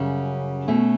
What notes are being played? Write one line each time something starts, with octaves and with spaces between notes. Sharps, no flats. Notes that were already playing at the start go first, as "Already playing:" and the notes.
Already playing: F#2 C#3 G3 C#4 F#4
B2 A3 C#4